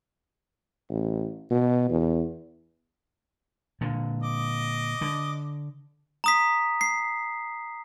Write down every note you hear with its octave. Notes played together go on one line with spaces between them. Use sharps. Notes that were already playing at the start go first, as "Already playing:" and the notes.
A1
B2
E2
A#2 D3
D#5 D6
D3
A#5 D#6 B6
C7